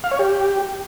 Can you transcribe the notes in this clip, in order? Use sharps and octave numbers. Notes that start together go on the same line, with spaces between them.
F5
C#5
G4